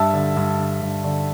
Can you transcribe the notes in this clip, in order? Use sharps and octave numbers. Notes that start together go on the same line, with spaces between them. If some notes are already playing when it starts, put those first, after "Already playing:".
Already playing: G2 E5 A5
D3
G2
D3
G2
D3